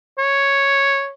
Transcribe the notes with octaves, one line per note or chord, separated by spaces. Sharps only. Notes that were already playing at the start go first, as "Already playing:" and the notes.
C#5